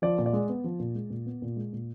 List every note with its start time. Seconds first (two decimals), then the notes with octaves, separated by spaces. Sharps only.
0.02 F3 D5
0.18 A#2
0.26 D5
0.33 G#3
0.49 B3
0.64 F3
0.79 A#2
0.95 G#3
1.10 A#2
1.26 B3
1.42 A#2
1.56 G#3
1.73 A#2